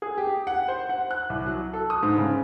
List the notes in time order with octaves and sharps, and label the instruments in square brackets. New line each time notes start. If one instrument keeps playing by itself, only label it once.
[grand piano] G#4
G4
F#5
C5
F#5
F#6
C2
F#3
A4
D#6
G#2
C#3